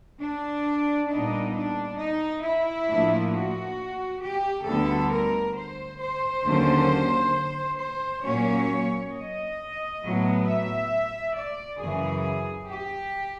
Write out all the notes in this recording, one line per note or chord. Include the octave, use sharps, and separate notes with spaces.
D4
A#2 G3 B3 D4 D#4
D4
D#4
E4
A2 F3 A#3 D4
F#4
G4
D2 D3 G3 B3 A4
A#4
C5
C5
D#2 D3 F#3 A#3 C#4
C5
A#2 F#3 A#3 C#4 C#5
D#5
A2 F#3 B3
E5
D5
F#2 C#3 E3 G#4
G4